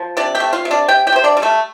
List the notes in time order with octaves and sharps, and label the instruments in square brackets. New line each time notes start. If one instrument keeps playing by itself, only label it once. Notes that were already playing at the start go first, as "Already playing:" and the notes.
Already playing: [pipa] F3
C3 D4 D5
G4 G5
A3
F4 F5
C3
D4 D5
C3 G4 G5
G4 G5
C3 C5
D4 D5
G3
A3 A4